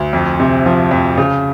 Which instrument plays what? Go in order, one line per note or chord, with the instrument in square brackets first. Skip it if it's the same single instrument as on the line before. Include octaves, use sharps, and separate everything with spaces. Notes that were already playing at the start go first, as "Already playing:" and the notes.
Already playing: [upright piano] D2
F2
C3
F3
F2
C#3